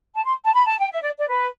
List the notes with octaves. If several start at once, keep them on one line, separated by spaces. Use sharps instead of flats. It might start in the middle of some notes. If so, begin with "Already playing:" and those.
A5
C6
A5
B5
A5
G5
E5
D5
D5
B4